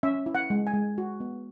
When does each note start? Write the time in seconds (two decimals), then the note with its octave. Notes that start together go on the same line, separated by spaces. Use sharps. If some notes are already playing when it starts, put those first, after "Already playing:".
0.03 C#4 E5
0.26 E4
0.35 F#5
0.50 G#3
0.67 G#5
0.74 G#3
0.98 F#4
1.20 B3